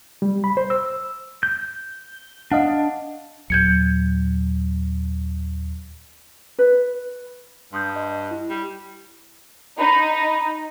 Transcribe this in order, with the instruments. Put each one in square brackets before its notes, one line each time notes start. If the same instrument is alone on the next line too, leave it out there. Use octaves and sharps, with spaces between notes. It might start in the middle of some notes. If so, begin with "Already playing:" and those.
[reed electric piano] G3
B5
C5
E6
[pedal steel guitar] G6
[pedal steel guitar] D4 [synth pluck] D#5 F5 F#5
[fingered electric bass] D#2 A#2 F#3 [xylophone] G6 G#6 C#7
[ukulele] B4
[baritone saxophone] G2 [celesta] C6 D#6 G6
[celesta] D#5
E4
[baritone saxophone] G3
[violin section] D#4 [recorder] B5